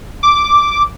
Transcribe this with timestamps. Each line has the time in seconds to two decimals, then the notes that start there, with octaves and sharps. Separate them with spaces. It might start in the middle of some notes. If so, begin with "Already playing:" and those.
0.23 D6